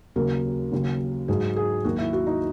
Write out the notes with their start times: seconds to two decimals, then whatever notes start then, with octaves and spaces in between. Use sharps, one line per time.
0.16 D#2 C#3 F#3 A#4
0.72 D#2 C#3 F#3
1.28 G#2 F#3 G#4
1.56 G#4
1.84 D#2 D#3 F#3 F#4
1.98 E4
2.13 F#4
2.27 D#4